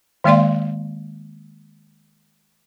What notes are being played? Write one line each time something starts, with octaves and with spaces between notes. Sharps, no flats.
D#3 G#3 A#3 D5 F5 C6